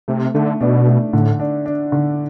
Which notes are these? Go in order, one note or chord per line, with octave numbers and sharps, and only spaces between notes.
C3 A3
D3 A3
B2 D4
A3
A2 D3
D4
D4
D3